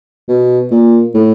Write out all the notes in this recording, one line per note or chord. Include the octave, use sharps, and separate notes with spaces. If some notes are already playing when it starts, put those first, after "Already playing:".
B2
A#2
A2